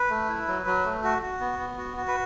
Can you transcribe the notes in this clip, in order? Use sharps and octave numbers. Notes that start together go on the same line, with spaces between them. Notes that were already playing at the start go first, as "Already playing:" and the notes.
Already playing: B4
A3
E4
F#3
F#3
A3
F#4
F#4
B3
B3
F#4
F#4
B4